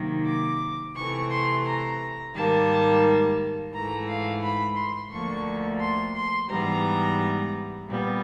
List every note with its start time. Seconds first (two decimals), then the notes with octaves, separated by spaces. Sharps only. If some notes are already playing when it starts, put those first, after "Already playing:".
Already playing: C3 D#3 F#3 A#3
0.27 D6
0.95 C3 E3 A3 C#6
1.30 C6
1.65 A#5
2.34 G#2 D#3 G3 A#3 A5
3.72 G#2 E3 A3 A#5
4.07 F5
4.42 B5
4.76 C6
5.11 D2 D3 F3 A#3 C#6
5.80 C6
6.15 C6
6.49 G#2 E3 G3 B3 A#5
7.88 A#2 G3 B3